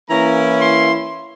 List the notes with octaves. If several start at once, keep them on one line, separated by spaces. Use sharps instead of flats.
E3 A#3 C#4 E4 A#5
C6